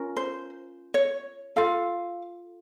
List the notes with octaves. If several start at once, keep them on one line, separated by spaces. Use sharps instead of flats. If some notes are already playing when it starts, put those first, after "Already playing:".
Already playing: C#4 F4 A#4
C5
C#5
F4 A4 F5